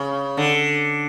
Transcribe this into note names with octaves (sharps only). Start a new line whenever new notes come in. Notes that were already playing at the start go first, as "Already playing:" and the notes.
Already playing: C#3
D3